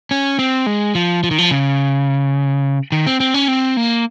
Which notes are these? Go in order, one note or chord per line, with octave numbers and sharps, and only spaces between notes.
C#4
C4
G#3
F3
F3
D#3
F3
C#3
D#3
C4
C4
C#4
C4
A#3